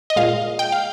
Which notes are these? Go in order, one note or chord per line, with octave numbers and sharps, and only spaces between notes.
D#5
A#2 G#3 F5
G5
F5